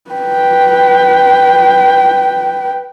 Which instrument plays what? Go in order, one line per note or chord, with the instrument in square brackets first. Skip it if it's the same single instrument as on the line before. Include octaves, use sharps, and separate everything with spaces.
[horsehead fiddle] B4 G5